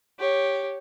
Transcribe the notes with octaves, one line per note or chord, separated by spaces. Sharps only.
G4 C#5